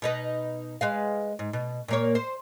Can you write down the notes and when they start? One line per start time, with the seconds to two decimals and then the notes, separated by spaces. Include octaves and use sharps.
0.02 B2 D#4 B4
0.81 G#3 B4 F5
1.39 G#2
1.53 B2
1.88 A#2 A#3 C#5
2.15 C5